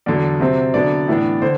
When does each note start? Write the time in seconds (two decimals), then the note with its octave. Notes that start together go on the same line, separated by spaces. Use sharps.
0.06 E2 D3 F#3 D5
0.40 C3 F#3 C4
0.74 D3 F#3 B3 D4 D5
1.08 A2 E3 B3 D4
1.42 D3 C5